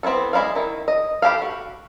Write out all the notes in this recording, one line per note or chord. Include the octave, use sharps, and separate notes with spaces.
B3 C4 E4 F4 A4
G#3 E4 D5 F5
D#3 E4
D#5
E4 G4 A4 F5
F#4